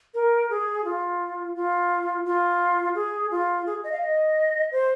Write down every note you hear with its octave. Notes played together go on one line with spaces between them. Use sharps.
A#4
G#4
F4
F4
F4
G#4
F4
G#4
D#5
F5
D#5
C5